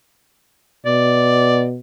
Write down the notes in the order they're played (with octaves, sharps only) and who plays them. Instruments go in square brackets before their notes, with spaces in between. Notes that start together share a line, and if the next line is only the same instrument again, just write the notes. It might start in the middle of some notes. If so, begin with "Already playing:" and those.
[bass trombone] B2 [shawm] D5